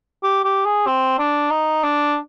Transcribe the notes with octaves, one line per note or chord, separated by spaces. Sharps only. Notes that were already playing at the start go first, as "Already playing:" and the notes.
G4
G4
G#4
C4
D4
D#4
D4